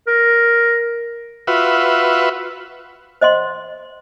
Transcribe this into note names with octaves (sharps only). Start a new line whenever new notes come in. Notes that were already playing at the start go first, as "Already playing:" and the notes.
A#4
F4 F#4 B4 E5
C5 D#5 F#5 C6